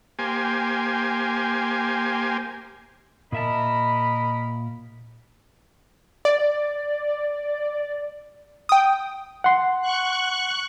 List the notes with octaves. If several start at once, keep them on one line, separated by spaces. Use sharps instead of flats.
A#3 G4 C5 G#5
A#2 A#4 D#5 E5 A5 B5
D5
G5 D#6
F#5 C6
C#6 F#6